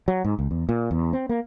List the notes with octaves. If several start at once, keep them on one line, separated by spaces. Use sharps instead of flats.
F#3
G#2
C#2
E2
A#2
E2
C4
A#3